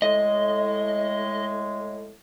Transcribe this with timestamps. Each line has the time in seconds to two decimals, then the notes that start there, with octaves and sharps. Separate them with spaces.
0.02 A2 G#3 D#5